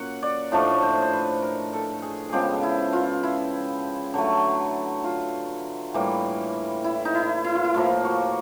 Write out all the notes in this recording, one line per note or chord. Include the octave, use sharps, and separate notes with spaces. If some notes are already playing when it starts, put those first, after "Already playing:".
Already playing: A#2 F#3 C#4 F#5
D5
A2 F3 A3 D4 D#5
C5
C5
B4
A#4
A4
G#4
C#3 F3 G#3 B3 G4 G#4
E4
F4
E4
D3 F#3 A3
F4
A2 E3 G3 A#3
E4
D#4
E4
E4
F4
E4
A2 F3 A#3 F4
F#4